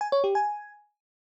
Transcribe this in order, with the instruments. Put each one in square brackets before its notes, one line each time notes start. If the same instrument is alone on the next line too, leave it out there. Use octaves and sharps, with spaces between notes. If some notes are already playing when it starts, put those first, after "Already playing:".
[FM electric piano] G#5
C#5
G4
G#5